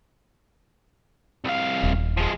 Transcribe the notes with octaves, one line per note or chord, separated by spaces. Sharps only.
C2 F5
D#1
F3 G#3